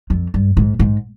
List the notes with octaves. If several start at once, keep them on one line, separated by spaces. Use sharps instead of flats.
F2
G2
G#2
G#2